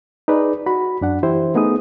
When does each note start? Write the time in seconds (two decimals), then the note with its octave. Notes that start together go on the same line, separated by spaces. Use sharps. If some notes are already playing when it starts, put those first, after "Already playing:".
0.28 D#4 G#4 B4 D5
0.66 F#4 B5
1.01 F#2 D4 F#5
1.23 E3 E4 G4 C5
1.55 A3 B3 D#4 G#4 D#6